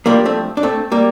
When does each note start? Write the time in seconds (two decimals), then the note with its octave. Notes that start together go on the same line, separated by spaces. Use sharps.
0.06 G2 F3 G3 A#3
0.25 A3 C4
0.57 D4
0.63 A3 C4
0.92 G3 A#3